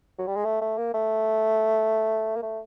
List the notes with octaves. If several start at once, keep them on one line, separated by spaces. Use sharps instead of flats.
F#3
G3
G#3
A3
A3
A#3
A3
A#3
A3